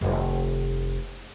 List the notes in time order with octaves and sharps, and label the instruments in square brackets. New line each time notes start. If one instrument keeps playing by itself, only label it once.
[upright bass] F1 D#3